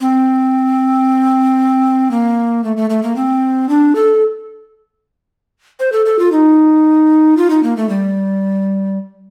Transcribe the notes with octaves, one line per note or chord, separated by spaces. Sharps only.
C4
A#3
A3
A3
A3
A#3
C4
D4
A4
C5
A4
A4
F4
D#4
F4
D#4
A#3
A3
G3